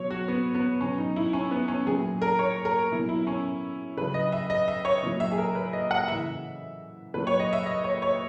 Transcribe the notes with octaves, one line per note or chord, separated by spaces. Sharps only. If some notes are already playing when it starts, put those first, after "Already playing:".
Already playing: B2 F#3 C#5
F#4
B3
B3
B2 F#3 C#4
D#4
E4
C#4
B3
C#4
A#2 F#3 G#4
A#4
C#5
A#4
B2 F#3 E4
E4
C#4
C#3 F#3 B4
D#5
E5
D#5
E5
C#5
A#2 F#3
E5
G#4
A#4
B4
D#5
F#5
C#3 E3 E5
A#2 F#3 B4
C#5
D#5
E5
D#5
C#5
C#5